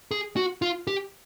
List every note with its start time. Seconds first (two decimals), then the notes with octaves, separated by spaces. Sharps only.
0.11 G#4
0.37 F#4
0.62 F4
0.87 G4